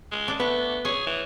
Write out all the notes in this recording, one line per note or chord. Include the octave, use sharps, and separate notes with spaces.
G#3
D4
A3 B3
G#4 C#5
E3